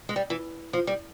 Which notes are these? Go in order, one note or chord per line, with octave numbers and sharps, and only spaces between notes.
G#3
G3
E3
F3
G3